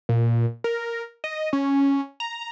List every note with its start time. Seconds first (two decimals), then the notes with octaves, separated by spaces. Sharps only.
0.09 A#2
0.64 A#4
1.24 D#5
1.53 C#4
2.20 A#5